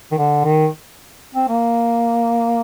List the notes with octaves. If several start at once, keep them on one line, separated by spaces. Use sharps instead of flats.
D#3
D3
D#3
C4
A#3